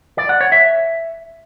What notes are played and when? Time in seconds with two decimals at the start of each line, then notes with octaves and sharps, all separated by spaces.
0.18 D5
0.29 F#5
0.41 C#5
0.52 E5